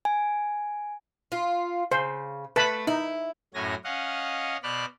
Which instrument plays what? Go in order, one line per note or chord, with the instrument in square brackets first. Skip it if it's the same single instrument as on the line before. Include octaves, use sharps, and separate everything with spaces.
[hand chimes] G#5
[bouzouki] F4
[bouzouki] C#3 [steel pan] C5
[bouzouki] A3 [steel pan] B4 A5 B5
[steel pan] D#4 [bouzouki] E4
[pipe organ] F#2 A2 F#3 C#4 G#5 A#6
C#4 D#5 F5 F#5
B2 C5 D5 B5 F6 F#6